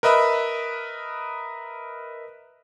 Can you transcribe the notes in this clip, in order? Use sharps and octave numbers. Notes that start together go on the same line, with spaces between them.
A#4 B4 D#5 E5 B5